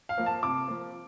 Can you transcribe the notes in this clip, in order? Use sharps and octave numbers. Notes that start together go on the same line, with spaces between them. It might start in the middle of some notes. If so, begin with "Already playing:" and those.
F5
F3 A#3
A5
C3 D6
F3 A#3